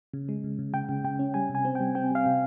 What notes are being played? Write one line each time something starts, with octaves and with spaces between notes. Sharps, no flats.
C#3
G#3
C#3
C#3
C#3 G5
C#3
C#3 G5
C#4
G3 G#5
C3
G#5
C4
G3 G5
C4 G5
G3 F5
C3